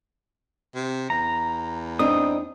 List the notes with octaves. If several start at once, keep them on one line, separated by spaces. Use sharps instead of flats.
C3
E2 A#5
C4 D4 D#4 D#6